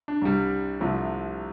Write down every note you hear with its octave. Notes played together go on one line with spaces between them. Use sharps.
D4
C2 C3 G3
C2 C3 F3 A3